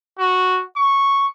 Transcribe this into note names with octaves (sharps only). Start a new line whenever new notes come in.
F#4
C#6